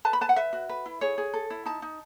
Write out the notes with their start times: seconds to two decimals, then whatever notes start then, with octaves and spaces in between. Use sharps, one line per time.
0.05 B4 A5
0.13 B5
0.21 B4 A5
0.29 F#5
0.36 B4 E5
0.53 F#4
0.69 B4
0.86 E4
1.01 G#4 C#5
1.18 G#4
1.34 A4
1.50 E4
1.66 D#4 A5
1.82 D#4